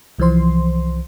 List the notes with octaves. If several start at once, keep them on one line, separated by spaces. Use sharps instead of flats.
C2 E3 F3 C5 C6